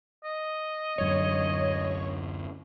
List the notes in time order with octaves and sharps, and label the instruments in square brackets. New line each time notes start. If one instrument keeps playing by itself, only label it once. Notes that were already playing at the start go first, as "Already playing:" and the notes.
[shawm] D#5
[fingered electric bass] D1 F#2 D3 [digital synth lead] C#5